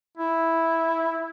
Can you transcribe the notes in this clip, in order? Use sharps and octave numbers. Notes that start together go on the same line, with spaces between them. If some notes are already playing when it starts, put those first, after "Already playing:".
E4